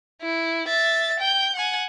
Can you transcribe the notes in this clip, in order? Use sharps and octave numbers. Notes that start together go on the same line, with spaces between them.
E4
E5 A6
G5 G6
F#5 G#5